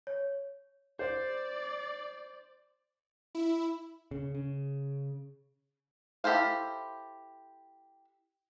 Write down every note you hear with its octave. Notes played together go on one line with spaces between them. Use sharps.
C#5
C5 D5
E4
C#3
C#3
E4 G4 A4 C5 F5